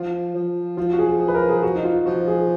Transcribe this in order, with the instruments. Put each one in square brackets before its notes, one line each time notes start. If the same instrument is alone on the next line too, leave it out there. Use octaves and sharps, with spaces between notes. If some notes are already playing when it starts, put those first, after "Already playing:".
Already playing: [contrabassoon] F3 [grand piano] F4
[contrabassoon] F3
[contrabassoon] F3 [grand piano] F4
[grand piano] F#4
G#4
G#4
B4
A#4
G#4
F#4
D#4
F4
[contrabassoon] F3 [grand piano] F#4
[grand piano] G#4